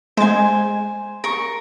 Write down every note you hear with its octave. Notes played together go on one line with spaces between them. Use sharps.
G#3 C5 G#5 G#6
A#4 C#6